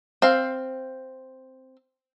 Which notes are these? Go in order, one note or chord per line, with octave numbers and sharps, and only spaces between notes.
C4 F5